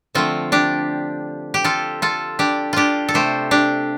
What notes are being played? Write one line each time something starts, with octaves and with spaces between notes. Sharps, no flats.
D3 F3 A3 C4 F4
D4 G4
G4
F4 A4
F4 A4
D4 G4
D4 F4 G4
A4
C3 A3 G4 C5
D4 G4